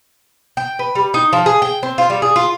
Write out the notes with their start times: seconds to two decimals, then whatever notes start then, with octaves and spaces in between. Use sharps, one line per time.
0.57 G5
0.79 B4
0.95 G3
1.14 D#4
1.33 F3
1.46 G#4
1.62 G5
1.83 C4
1.98 F4
2.10 G3
2.22 G#4
2.36 F4